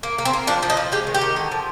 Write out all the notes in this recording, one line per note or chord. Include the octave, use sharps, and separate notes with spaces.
A#3
A#3
C4
A#3
F3 D4
F3
D#4
F3
G#3 G4
D#3
G4
D#3
D3
F3